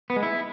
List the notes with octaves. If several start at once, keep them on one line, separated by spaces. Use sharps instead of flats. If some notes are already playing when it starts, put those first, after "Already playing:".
B3
G#3
E4